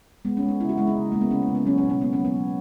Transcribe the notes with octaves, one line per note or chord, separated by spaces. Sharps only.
G#3 B3
C#4
G#3
D#4
C#3 E4
F#4
G#3 E4
D#4
C#3
G#3 A#3
B3
C#3 C#4
A#3
C#3
B3
F#3 C#4
C#4
B2
C#4
A#3 B3
C#4
F#3
B3
F#3